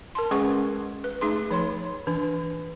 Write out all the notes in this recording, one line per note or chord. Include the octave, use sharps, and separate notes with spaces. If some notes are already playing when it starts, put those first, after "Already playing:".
A#4 A5 C6
G#3 C#4 G#4 B4 F#5 C#6
B4
A3 D#4 G#4 C6
F3 C#5 C6
E3 D4